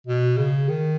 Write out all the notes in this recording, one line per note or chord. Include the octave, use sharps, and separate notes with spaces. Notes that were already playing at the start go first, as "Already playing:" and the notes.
B2
C#3
D#3